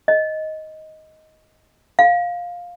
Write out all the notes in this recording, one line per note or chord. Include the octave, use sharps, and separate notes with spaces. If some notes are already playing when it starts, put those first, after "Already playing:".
D#5
F5